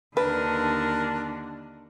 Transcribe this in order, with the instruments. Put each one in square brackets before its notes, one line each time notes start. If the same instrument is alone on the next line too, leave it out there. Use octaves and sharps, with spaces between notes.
[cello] D#2 D3 [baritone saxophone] D4 [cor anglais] A#4 [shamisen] B4